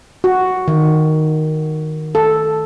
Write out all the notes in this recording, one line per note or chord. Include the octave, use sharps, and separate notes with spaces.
F#4
D#3
A4